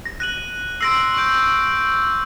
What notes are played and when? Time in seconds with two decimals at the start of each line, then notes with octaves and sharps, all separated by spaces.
0.06 A#6
0.20 F#6 A#6 D#7 F#7
0.81 C6 E6 A#6 C7 D7
1.14 C#6 E6 G6 D7